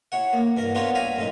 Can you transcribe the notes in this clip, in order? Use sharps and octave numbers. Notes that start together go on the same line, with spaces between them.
E4 C#5 F#5
A#3
G2 E3 A#4
B3 D4 F4 A#4 C5 C#5
D5 E5 F5 G5 G#5 A#5
F#2 A2 D#4